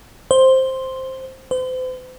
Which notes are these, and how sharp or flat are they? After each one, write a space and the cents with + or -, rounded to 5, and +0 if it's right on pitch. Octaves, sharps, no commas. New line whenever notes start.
C5 +5
C5 -40